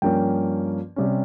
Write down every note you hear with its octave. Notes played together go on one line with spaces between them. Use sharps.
G2 F3 A#3 C#4 G5
C3 G3 C#4